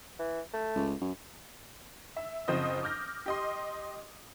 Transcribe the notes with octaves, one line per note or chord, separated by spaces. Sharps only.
E3
A3
C#2
F#2
E5
F#1 F3 C4 C5 D#5 D#6
D6 F6 G6 A#6
G4 D#5 C6